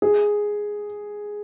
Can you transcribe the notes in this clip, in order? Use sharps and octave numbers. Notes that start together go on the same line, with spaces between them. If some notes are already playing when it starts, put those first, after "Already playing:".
G#4